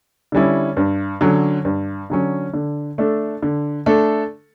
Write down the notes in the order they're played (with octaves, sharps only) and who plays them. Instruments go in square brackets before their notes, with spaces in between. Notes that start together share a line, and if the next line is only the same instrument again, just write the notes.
[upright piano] D3 G3 C#4 E4
G2
D3 F#3 C#4
G2
D3 F#3 C#4
D3
A3 D4 A4
D3
A3 D4 A4